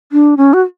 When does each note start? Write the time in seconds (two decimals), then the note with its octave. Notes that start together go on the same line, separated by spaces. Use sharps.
0.12 D4
0.37 C#4
0.53 F#4